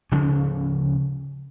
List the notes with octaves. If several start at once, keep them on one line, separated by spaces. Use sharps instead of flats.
D2 C#3 F3 C#4